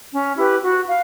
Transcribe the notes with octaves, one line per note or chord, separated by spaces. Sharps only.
C#4
E4 G4 B4
F#4
F5